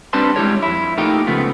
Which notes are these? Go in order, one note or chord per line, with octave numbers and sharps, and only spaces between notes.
G3 C4 D4 B4 A5 C6
G3 G#3 E4 G4 A#4 C#5
F2 E4
A3 A#3 D#4 F4 G4
C#2 C#3 F3 A3 B3